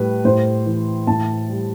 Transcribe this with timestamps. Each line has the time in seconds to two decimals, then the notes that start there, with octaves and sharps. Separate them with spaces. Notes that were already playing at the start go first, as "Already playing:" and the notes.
Already playing: A2 G3 B4
0.25 A2 C5
0.66 E3
1.07 A2 A5
1.49 G3